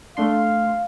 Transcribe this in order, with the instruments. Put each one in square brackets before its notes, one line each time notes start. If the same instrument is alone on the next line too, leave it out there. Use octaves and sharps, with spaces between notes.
[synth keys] A3 D4 C6 [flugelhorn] F5